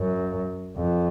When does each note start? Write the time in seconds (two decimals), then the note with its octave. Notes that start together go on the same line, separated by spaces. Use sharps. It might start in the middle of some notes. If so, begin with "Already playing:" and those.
Already playing: F#2
0.77 F2